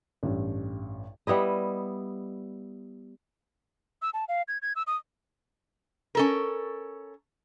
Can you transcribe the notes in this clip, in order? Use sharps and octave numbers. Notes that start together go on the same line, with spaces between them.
A1 G2
G3 B3 E4 D#5
E6
A5
F5
G#6
G#6
E6
D#6
C#4 A4 A#4